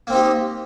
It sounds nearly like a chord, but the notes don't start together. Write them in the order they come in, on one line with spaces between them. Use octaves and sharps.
A#3 C4 D#4 G4